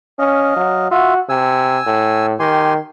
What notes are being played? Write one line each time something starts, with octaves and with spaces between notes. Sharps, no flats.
C#4 D#5 F5
F#3
F4 F#4 E5
C3 G#5 E6
A2
D#3 G4 G#5 C6